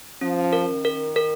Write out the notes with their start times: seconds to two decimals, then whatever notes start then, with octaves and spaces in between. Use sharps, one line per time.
0.21 F3 C#4
0.53 A#4
0.68 D#3
0.85 A#4
1.16 A#4